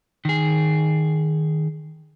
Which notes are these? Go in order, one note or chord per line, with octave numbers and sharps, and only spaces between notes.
D#3 G#4